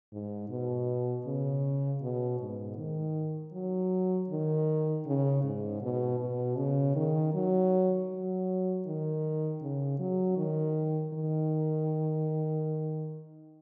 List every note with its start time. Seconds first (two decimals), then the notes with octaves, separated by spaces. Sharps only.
0.12 G#2
0.49 B2
1.26 C#3
2.02 B2
2.40 G#2
2.77 D#3
3.53 F#3
4.29 D#3
5.06 C#3
5.44 G#2
5.82 B2
6.19 B2
6.57 C#3
6.95 D#3
7.34 F#3
8.10 F#3
8.86 D#3
9.61 C#3
9.99 F#3
10.37 D#3
11.13 D#3